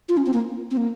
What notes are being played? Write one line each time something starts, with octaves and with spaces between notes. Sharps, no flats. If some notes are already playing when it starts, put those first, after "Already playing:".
F4
C#4
C4
A#3
C4
A#3